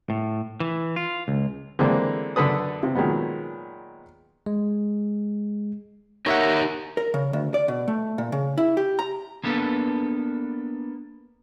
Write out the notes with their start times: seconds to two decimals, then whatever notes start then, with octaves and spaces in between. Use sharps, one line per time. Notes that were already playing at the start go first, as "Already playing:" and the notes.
0.10 A2
0.60 E3
0.96 F4
1.28 C#2
1.79 D3 E3 G#3 A#3 C4
2.36 F#2 D3 A4 B4 D#6
2.83 C3
2.95 A#2 D#3 F#3 G#3 B3
4.46 G#3
6.26 D#4 G4 A#4 C#5 E5 F#5
6.97 A#4
7.14 C#3
7.33 D2
7.54 D5
7.68 B2
7.88 A3
8.18 A#2
8.32 C#3
8.58 E4
8.77 G4
8.99 A#5
9.44 A#3 B3 D4 A4 B4